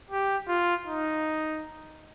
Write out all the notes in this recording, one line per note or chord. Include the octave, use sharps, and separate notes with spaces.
G4
F4
D#4